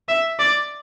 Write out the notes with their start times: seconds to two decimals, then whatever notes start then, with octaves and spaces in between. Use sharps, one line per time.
0.09 E5
0.39 D5